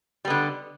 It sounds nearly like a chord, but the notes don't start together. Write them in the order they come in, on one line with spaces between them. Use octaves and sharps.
G3 B3 D3